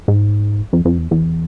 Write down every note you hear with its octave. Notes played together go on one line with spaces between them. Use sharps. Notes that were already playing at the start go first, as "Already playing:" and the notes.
G#2
F2
F2
E2
E2